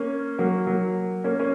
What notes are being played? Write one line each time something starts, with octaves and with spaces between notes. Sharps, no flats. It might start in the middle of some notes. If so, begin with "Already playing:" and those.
Already playing: A#3 C#4
F#3 A#3
F#3 A#3
A#3 C#4
A#3 C#4